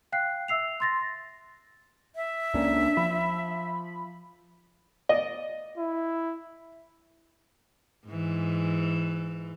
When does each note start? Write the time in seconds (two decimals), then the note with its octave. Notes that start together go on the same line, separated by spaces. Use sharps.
0.12 F5 G5 F#6 C7
0.48 E5 E6 C7 F7
0.80 C6 A6 A#6
2.16 E5
2.54 C#2 A#3 C#4 D4
2.97 F3 B5
5.09 D5 D#5
5.78 E4
8.08 G#2 E3